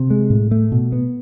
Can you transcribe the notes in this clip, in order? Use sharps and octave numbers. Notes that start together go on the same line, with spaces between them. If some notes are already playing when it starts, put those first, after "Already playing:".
Already playing: C3
G#3
A2
A3
B2
B3